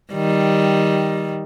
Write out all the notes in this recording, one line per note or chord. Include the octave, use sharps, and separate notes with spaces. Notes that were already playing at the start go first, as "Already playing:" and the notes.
D#3 G3